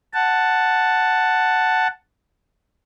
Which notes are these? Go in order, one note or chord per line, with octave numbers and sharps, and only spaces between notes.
F#5 A5